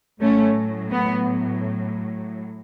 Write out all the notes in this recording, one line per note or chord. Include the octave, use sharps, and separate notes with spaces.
A2 F#3 A3 C#4
B3